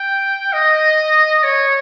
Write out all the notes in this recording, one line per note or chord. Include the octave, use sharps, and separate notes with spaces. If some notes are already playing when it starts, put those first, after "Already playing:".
Already playing: G5
D#5
C#5